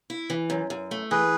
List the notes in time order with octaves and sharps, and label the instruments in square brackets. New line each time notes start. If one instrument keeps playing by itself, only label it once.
[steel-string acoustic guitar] E4
E3
F#2
F#2
A3
[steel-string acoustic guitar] E3 [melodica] G#4 B4